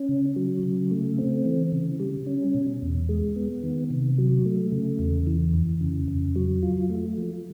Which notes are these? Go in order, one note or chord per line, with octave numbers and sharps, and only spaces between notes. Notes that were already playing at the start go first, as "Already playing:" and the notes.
Already playing: C#4
C#3
F#3
C#3
A3
C4
E3
C#3
G3
C#4
B2
E2
G#3
B3
D#3
C3
F#3
A3
C#3
E2
E3
F2
C#3
F2
F#3
F4
A3
F3